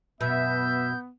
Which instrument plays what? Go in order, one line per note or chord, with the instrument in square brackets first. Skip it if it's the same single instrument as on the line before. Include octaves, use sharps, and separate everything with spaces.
[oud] F#2 B2 [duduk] B3 [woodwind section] E5 [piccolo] G6